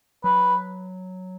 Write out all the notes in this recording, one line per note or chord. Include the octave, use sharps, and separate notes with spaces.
F#3 B4